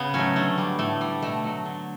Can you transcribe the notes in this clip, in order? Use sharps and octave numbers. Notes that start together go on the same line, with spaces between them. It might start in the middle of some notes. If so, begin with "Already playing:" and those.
Already playing: C#3 B3
F#3 A3 C#4
D3 A3
G3
A2 A3
G3
B2 A3
F#3 A3
D3